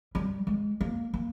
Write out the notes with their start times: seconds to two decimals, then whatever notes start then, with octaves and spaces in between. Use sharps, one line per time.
0.15 G3
0.47 G#3
0.81 A#3
1.14 A#3